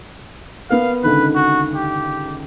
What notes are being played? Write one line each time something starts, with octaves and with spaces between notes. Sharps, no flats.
B3 A#4 F5
C#2 D3 D#3 B4
F#4
G4